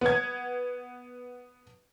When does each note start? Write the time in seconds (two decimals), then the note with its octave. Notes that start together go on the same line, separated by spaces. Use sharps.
0.01 B3 G#6